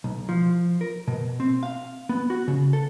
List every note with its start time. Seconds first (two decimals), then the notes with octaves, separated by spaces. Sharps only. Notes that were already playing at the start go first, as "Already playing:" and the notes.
0.04 B1
0.29 F3
0.81 A#4
1.08 B2
1.40 C4
1.63 F5
2.09 B3
2.30 F#4
2.48 C#3
2.73 A4